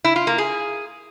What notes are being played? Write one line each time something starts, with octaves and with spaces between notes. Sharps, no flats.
E4
F4
A#3
G#4